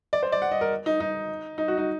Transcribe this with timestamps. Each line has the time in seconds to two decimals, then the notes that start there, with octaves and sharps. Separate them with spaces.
0.13 D5
0.23 C5
0.32 D5
0.42 F#5
0.52 D#5
0.61 A#4
0.86 D#4
1.00 D#4
1.58 D#4
1.68 F#4
1.78 D#4